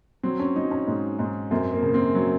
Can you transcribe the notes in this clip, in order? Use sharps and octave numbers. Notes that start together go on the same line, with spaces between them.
F#3 C4
C#4
F#3 D#4
C#4
G#2
G#2
F#2 C4
A#3
C#3
C4
F#3